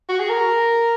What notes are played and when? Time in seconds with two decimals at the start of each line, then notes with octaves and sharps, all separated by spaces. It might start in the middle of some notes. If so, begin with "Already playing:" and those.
0.09 F#4
0.20 G#4
0.29 A#4